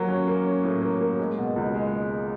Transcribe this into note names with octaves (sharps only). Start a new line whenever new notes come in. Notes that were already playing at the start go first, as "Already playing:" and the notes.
Already playing: F#3 A#3
C#4
A#3
C#4
A2
A#3
A#3
G#3
B2
C#2
G#3